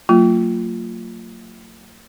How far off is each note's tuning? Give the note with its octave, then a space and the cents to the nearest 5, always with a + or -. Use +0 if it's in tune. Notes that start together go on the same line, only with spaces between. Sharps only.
F#3 -5 A#3 -35 F4 +0